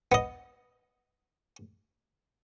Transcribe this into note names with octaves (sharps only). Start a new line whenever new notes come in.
B3 D#5